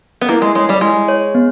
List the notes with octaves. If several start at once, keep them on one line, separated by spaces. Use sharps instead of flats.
B3
A#3 E4
G#3
G#3 C#5
G3
G#3 E4
C#5
B3